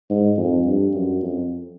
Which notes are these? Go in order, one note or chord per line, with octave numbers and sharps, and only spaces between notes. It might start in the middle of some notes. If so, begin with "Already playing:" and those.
G#2
F2
G2
F#2
F2